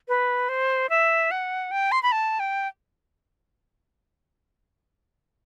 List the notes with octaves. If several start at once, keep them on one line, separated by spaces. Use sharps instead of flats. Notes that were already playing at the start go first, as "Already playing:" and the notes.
B4
C5
E5
F#5
G5
C6
B5
A5
G5